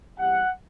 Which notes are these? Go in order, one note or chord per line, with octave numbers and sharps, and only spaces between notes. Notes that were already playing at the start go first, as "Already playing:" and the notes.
E2 C3 G3 F#5